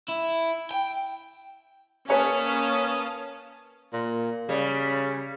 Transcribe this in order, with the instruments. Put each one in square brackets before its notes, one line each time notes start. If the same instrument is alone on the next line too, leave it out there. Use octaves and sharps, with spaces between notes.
[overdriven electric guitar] E4
G5
[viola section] A#3 C#4 [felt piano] B4 C#5 G#5 [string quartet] F5 A5 D#6
[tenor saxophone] A#2
[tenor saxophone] C#3 [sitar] G3